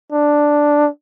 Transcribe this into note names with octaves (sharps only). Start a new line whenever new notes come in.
D4